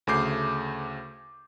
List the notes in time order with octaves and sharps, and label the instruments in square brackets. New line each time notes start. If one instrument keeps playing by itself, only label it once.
[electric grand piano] D2 C#3 A3 D6 G6 C7